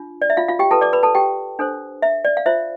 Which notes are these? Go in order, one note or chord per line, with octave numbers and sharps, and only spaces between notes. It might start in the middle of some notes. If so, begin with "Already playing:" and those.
Already playing: D4 F4
D5
E5
F4 F5
F4 F5
G4 G5
F4 A4 B4 A5
D5 D6
B4 B5
A4 A5
G4 G5
D4 A4 C5
E5
D5
F5
F4 C5 E5